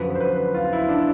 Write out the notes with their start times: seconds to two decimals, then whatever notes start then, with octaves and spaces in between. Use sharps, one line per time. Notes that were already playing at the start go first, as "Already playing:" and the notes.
Already playing: F#2 D3 F3 B4
0.15 C5
0.20 B4
0.54 F4
0.73 E4
0.89 D4